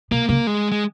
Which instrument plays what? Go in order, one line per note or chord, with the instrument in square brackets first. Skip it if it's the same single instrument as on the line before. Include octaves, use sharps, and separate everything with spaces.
[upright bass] B2 [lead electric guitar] A#3
[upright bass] C#3 [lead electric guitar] A#3
[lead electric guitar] G#3
G#3